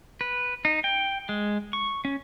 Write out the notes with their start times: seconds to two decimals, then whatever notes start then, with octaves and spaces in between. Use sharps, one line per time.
0.21 B4
0.65 D#4
0.84 G5
1.29 G#3
1.73 C#6
2.05 C#4